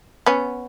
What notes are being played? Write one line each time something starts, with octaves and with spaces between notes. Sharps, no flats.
B3 C#4